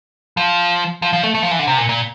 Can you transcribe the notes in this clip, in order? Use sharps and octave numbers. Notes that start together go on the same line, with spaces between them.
F3
F3
F3
A3
A3
F3
E3
D3
C3
A#2
A#2